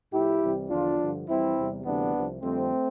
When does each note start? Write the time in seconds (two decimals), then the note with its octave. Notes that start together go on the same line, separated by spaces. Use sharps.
0.12 A2 F3 E4 G4
0.41 C2 C3 E3 G3
0.69 E2 D3 F3 D4 F4
0.98 G2 D3 F3
1.27 F2 E3 G3 C4 E4
1.56 E2 C3 G3
1.85 D2 C3 E3 G3 B3 D4
2.14 C2 C3 F3
2.42 F2 D3 G3 A3 C4